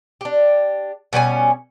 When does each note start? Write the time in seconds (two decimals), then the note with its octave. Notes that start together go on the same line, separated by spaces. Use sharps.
0.21 D4 G4
1.13 B2 G3 C#4 G#5